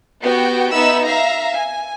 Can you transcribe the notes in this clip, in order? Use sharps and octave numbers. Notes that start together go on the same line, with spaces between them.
B3 F#4 G4 G5
B3 D#4 E5 B5 E6
E5 F5 A#5
G#5